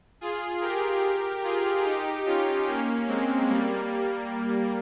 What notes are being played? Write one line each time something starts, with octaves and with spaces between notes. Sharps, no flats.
F4 G#4
G4 A#4
F4 G#4
D#4 G4
C#4 F4
A#3 C#4
G#3 C4
G3 A#3
G3